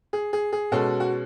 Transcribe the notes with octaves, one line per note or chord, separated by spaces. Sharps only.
G#4
G#4
G#4
B2 G#3 C#4 F#4 A4
F#4